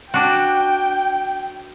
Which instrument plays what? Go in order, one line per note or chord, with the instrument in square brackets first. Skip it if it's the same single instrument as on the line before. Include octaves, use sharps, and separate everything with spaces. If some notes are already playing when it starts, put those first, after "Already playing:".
[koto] D4 F#4 [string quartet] G5